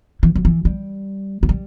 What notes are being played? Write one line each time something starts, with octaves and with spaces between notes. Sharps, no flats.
E3
F#3
E3
G3
F#3
G3